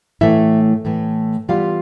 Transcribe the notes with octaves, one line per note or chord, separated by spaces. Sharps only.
A2 E3 A3 E4 E5
A2 E3 A3
E3 G3 B3 F4 F5